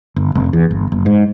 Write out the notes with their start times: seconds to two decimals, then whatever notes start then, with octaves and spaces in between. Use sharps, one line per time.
0.16 G1
0.35 F1
0.53 E2
0.71 G1
0.92 F#1
1.06 G#2